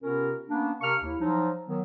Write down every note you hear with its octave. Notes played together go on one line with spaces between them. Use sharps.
C3 B3 C#4 F4 A#4
A#3 B3 C#4 D4
C3 D4 A#4 F5 C#6 F6
D#2 E4
F3 F#3 D#4
D#3 F#3 B3